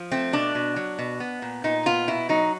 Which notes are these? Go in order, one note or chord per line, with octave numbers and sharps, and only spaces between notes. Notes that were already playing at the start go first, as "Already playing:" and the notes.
Already playing: F3
A3 C4
B2 D4
B2
F#3
B2
B3
A#2
A#2 D#4
B3 F4
B2 E4
F#3 D#4